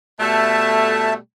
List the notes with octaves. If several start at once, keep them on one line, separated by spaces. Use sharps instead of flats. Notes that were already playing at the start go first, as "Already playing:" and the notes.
B2 G3 A3 E5 A5